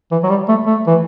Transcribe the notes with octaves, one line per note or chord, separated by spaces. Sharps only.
E3
F#3
G3
A3
A3
E3